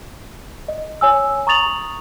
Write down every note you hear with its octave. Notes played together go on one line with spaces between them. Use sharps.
D#5
C#5 G#5 E6
A#5 C#6 D#6 A6 F7 F#7